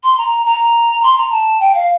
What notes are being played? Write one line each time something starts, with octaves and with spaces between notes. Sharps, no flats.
C6
A#5
A#5
C6
A#5
A5
G5
F5